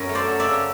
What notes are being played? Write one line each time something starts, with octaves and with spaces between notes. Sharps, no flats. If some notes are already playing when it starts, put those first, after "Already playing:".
Already playing: F#2 F#3 A#4
A3
C5 D5
F#3
D5 E5
C#3